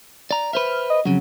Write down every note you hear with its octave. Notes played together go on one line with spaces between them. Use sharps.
D5 A#5
B4 C5 E5 F6
D#5
F2 C#3 F#3